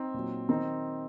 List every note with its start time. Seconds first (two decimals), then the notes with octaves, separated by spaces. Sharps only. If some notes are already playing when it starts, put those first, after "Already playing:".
Already playing: C4 D#4
0.14 A#2 F#3
0.49 D#3 F#3 C4 D#4